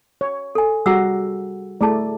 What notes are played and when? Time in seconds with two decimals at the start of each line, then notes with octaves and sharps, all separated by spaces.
0.21 C#5
0.55 A4 G#5
0.86 G3 F#4 G#4 F#5 A#5 E6
1.81 A3 E4 G#4 D5 A5